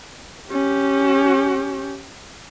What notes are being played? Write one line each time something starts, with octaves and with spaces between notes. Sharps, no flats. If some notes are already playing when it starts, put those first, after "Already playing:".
C#4 G4